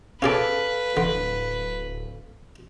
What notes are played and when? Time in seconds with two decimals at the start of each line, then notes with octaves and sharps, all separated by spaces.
0.22 C#4 G#4 A4 B4 D5 F5
0.97 D1 D3